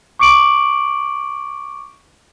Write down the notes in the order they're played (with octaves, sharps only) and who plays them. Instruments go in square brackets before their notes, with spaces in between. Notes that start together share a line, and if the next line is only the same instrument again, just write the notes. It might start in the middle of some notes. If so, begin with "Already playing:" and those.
[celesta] C#6 D6 C#7 D7 F#7